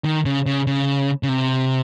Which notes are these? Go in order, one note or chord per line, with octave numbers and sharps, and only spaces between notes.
D#3
C#3
C#3
C#3
C#3
C3